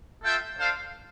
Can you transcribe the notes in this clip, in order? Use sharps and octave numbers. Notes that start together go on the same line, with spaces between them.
F4 A4 E5 G5
D4 A4 C5 F5